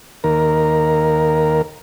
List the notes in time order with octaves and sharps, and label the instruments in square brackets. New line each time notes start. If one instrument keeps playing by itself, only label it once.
[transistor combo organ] D#2 A#4